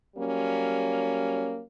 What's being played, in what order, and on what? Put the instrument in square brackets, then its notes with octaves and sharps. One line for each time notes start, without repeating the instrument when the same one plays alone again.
[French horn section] F#3 G3 A#3 C#4